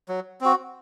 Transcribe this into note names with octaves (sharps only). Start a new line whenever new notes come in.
F#3
C4 F#4